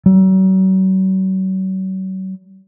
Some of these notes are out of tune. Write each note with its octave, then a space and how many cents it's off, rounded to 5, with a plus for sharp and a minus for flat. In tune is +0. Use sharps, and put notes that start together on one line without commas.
F#3 +40